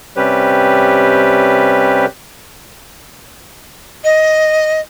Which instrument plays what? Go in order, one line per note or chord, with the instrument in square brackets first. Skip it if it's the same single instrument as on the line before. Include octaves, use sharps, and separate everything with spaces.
[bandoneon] C3 G3 C#4 G4 B4
[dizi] D#5